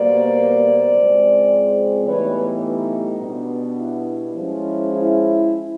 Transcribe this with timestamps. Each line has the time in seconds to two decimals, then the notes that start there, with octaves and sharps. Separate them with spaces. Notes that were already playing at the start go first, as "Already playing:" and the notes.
Already playing: B2 G3 A#3 C5 D5
0.91 C#3 F3 G#3 C4
2.05 A2 E3 G3 B3 D#4 B4 C#5
3.20 B2 G3 B3 D4
3.78 E4
4.35 F3 G#3 C#4
4.93 E4